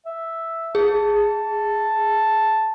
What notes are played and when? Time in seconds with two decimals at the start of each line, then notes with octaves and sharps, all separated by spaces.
0.06 E5
0.75 G#4 A5